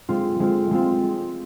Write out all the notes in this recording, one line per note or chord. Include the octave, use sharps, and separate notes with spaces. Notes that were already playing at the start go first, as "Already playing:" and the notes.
G#3 C4 F4
G#3 C4 F4
G#3 C4 F4